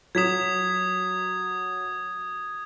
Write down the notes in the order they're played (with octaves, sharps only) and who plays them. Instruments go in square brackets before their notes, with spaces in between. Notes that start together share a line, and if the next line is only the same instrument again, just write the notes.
[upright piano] F#3 B6 E7 [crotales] D#6 G#6